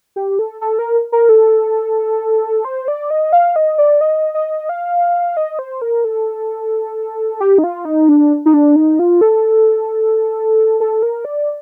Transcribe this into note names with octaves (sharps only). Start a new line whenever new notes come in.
G4
A4
A4
A#4
A#4
A4
C5
D5
D#5
F5
D#5
D5
D#5
D#5
F5
D#5
C5
A#4
A4
G4
D#4
F4
D#4
D4
D#4
D4
D#4
F4
A4
A4
A#4
D5